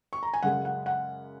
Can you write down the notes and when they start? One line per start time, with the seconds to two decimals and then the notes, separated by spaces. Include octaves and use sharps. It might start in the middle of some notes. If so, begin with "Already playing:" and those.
0.13 C#6
0.23 A#5
0.34 G#5
0.43 F#2 C#3 G#3 F#5
0.65 F#5
0.86 F#5